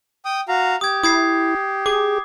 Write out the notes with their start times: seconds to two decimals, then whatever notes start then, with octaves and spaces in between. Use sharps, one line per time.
0.25 G5 D#6
0.48 F#4 F5 A#5
0.81 G4 D#6 G#6
1.03 E4 D#6 G#6 C7
1.86 G#4 D6